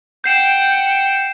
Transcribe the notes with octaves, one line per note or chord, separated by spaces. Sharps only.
F#5 G5 G6 C7 E7